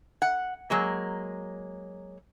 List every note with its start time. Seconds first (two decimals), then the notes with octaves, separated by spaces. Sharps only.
0.22 F#5
0.70 F#3 G#3 A#3